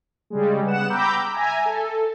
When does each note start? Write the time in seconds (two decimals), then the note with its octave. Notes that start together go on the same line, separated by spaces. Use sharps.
0.30 C#3 G3 G#3
0.64 C#3 B3 F#5 E7
0.90 G5 A#5 B5 D6 E6 G6
1.32 E5 G#5 A#5
1.66 A4